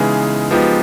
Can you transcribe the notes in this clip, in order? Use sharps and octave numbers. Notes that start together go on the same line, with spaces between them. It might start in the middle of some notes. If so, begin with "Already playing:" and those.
Already playing: C#3 E3 G#3 B3 D#4
F3 G#3 B3 D#4 G4